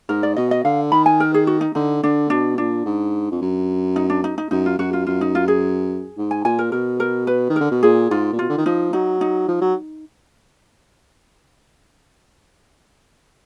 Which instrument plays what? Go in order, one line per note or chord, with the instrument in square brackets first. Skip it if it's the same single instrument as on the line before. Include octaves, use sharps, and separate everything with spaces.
[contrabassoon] G#2 [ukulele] A#4
[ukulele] D5
[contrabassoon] B2 [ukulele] D#5
[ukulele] D#5
[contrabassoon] D3 [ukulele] F5
[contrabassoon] D#3 [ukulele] B5
[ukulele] G#5
A#4
G#4
F#4
D#4
[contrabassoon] D3 [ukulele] D#4
[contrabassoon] D3 [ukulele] D4
[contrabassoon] B2 [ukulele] D4
[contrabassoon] A#2 [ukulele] D4
[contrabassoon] G#2
F2
F#2
[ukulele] D#4
D4
D#4
D#4
[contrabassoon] F#2 [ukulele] D#4
[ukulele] F4
[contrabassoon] F#2 [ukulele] F#4
[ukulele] F4
[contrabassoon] F#2 [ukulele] F4
[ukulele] D#4
F4
G#4
[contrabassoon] G#2
[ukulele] G#5
[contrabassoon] A#2 [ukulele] G#5
[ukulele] A#4
[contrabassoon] B2 [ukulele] A#4
[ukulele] A#4
B4
[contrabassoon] D#3
[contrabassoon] D3 [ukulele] A#4
[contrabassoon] B2
[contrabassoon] A#2 [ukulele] G#4
[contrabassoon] G#2 [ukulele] F4
[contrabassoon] A#2
[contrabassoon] B2 [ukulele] F4
[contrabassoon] D3
D#3
[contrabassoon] F3 [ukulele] D#4
[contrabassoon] F#3 [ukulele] D#4
[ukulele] D#4
[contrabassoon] F3
F#3